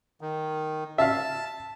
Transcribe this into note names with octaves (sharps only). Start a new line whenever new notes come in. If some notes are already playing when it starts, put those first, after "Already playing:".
D#3
E5 F5 A5